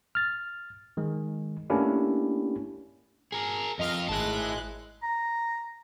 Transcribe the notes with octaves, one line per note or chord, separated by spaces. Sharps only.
F6 A6
D#3 G#3
A3 A#3 C#4 D4 E4 G4
G#4 A#4
F2 F4 D#5 F6
G#1 G#3 E4 A5 F#6
A#5